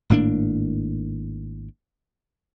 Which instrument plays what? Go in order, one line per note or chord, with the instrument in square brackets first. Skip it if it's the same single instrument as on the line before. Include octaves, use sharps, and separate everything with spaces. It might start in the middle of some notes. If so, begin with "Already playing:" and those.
[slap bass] G#1 A2 A#3 D4